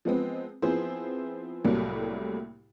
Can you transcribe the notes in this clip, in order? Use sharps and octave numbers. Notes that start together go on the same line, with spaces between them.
F3 G#3 B3 C4
F3 B3 C4 E4 G#4 C5
C2 A2 F#3 G3 A3 A#3